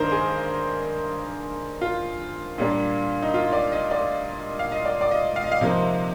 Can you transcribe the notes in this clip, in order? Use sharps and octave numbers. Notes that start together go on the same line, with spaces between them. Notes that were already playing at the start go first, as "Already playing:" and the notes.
Already playing: G2 D#3 A#3 D4 A#4 C5 D#5
G#4
F4
A#2 G3 A#3 D4
D#4
F4
D5
D#5
D5
F5
D#5
D5
D5
D#5
F5
D#5
F5
C3 F3 A#3 D#4